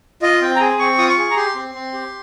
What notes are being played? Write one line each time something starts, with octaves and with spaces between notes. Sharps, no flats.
F4 D#5
C4 G5
A#5
G#4 G#5
C4 C#6
F4 D#6
C#6
G#4
A#5
G4 C6
C4
C4
G4